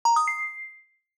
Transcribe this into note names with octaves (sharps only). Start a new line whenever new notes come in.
A#5
D#6
C7